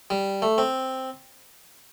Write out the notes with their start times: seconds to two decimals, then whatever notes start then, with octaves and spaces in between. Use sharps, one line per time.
0.10 G3
0.42 A3
0.58 C4